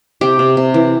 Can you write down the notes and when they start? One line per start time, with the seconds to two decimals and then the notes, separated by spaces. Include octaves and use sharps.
0.21 C3 G4
0.39 C3
0.57 C3
0.74 E3